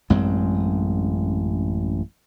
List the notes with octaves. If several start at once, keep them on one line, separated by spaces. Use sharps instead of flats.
A1 F#2 G#3 C4